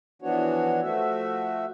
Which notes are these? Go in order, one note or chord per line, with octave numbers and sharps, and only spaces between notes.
E3 F3 B3 D4 F#4 C#5
F3 A3 F#4 E5